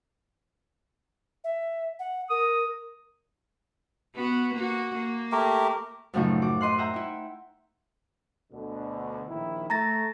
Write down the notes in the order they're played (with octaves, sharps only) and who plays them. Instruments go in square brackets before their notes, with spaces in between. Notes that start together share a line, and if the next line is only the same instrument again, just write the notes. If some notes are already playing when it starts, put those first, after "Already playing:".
[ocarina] E5
F#5
[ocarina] A#4 [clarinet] D#6
[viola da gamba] B3 F#4
A#3 F#4
A#3
[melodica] A3 G4 A#4
[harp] F#2 A2 C#3 F3 F#3 D#4
F#4 D6
D#5 C6 F#6
E5 F#5 G5 A#5
D#4 E4
[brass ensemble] D2 B2 D3
A#1 D#3 E4
[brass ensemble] A3 [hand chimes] A#5 A6 A#6